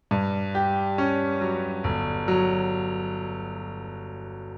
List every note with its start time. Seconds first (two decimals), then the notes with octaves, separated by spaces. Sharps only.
0.11 G2
0.55 G4
0.98 C#4
1.41 F#3
1.84 G1
2.28 F#3